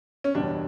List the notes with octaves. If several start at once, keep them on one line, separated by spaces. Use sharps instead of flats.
C#4
F#1 E2 B2 G3 D4